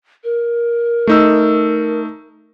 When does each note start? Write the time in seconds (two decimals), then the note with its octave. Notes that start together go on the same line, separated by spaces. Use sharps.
0.24 A#4
1.07 A3 D#4 E6